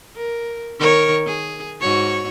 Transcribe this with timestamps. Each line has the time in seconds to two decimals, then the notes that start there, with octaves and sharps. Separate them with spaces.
0.16 A#4
0.79 D#3 A#4 C#5
1.26 G#4
1.80 G#2 F#4 C#5